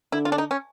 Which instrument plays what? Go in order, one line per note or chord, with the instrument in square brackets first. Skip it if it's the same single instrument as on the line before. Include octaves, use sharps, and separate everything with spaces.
[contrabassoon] D3 [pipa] E4
[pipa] F4
D4
D#4
C#4